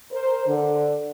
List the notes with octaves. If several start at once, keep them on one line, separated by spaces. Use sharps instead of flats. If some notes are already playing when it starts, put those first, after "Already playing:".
A#4 C5
D3